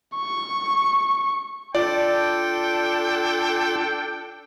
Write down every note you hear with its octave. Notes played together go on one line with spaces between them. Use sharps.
C#6
D4 F4 A4 D5 G5